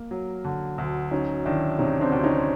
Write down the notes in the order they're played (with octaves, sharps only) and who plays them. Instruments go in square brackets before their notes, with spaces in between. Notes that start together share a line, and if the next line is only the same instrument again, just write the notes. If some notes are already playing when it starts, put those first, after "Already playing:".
Already playing: [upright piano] A#3
F#3
D3
D2
[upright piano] F#3 [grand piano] C#4 D#4
[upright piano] D#3 [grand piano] D4 E4
[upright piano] C3 [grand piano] C#4 D#4
[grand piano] C4 D4
[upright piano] D2
[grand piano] C#4 D#4